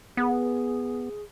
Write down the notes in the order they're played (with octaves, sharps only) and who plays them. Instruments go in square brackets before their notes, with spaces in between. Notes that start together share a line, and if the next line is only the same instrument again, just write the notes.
[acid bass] B3 [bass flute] G#4